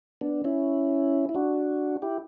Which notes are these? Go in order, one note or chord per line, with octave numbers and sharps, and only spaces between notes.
B3 D4
C#4 E4
E4
D4 F#4
E4 G4